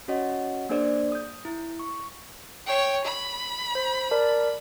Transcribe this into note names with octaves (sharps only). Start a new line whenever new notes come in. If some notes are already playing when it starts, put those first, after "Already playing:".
C#4 F#4 C#5 D#5 F#5
A#3 D4 G#4 C5 D5
D#6 G6
E4
C#6
C#5 G5
B5
C5
A#4 D5 A5